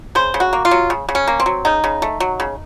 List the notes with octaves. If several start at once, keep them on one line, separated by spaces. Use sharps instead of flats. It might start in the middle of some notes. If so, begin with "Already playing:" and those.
C#3 C5
C#3
F#4
A#3
F4
F#3
C#3
C#3
C#4
A#3
C4
F#3
C#3 D#4
C#3
A3
F#3
C#3